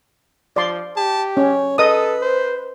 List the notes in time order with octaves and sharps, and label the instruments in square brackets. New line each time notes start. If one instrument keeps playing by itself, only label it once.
[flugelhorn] F3 [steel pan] D5 C6
[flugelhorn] G4 [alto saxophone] A5
[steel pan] C#4 [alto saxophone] C#5
[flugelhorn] A4 [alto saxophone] B4 [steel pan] D#5 D#6
[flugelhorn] C5